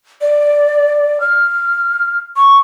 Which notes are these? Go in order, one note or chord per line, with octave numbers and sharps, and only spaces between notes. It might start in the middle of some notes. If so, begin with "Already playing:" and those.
D5
F6
C#6